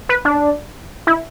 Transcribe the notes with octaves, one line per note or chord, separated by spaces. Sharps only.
B4
D4
E4